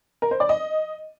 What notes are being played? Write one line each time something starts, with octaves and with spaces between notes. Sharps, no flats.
A#4
C5
D5
D#5